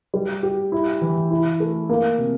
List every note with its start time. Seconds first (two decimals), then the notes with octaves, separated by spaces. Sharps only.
0.14 G3
0.43 G4
0.72 E4
1.02 E3
1.31 E4
1.60 A3
1.89 A#3
2.18 C3